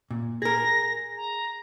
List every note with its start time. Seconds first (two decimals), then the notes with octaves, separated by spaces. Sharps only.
0.11 A#2
0.42 G#4 A#4 A#6
1.17 A#5